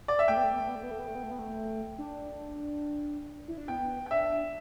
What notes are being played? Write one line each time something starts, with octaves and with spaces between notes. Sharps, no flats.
D5
E5
A3 G5
B3
A3
B3
A3
B3
A3
B3
A3
B3
A3
B3
A3
B3
A3
D4
E4
D4
B3 G5
G5
D4 E5